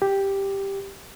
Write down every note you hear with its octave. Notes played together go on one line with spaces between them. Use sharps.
G4